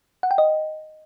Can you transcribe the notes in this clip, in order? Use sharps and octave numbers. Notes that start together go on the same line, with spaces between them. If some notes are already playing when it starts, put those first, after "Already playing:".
F#5
G5
D#5